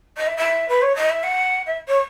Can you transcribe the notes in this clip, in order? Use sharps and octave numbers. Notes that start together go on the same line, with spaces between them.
D#5
E5
E5
B4
C#5
D#5
E5
F#5
E5
C#5